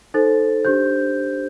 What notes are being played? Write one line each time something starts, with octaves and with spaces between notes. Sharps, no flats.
D#4 A4 C5 A6
D4 G4 C5 G6